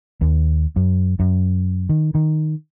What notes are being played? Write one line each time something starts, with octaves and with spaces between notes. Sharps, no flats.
D#2
F#2
F#2
D#3
D#3